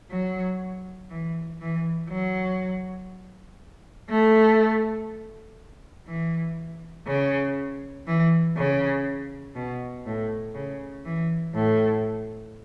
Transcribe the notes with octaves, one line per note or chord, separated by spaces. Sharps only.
F#3
E3
E3
F#3
A3
E3
C#3
E3
C#3
B2
A2
C#3
E3
A2